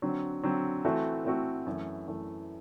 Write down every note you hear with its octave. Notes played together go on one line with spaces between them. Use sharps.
D3 F#3 C4
D3 F#3 C4
E3 A3 C4 F#4 A4
E3 A3 C4 F#4 A4
F#2 E3 A3
F#2 E3 A3